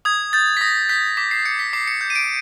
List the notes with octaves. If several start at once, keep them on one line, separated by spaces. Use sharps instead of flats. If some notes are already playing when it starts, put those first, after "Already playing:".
D#6 G#6
G6 A6
B6
D#6 A#6
G6 B6
D6 B6
C7
G6 C#7
B6
D6 C7
C#7
G6
D#7
D7